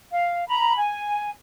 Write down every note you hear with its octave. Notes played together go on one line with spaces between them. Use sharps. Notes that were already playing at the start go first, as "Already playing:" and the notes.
F5
A#5 B5
G#5